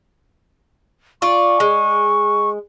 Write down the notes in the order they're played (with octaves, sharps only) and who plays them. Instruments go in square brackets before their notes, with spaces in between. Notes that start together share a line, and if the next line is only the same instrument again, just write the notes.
[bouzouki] F4 D5 [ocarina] C#6
[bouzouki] G#3